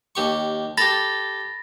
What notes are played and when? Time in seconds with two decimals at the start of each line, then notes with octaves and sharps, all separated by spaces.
0.15 D#2 G4 C#6
0.78 G4 A4 B5 A6 A#6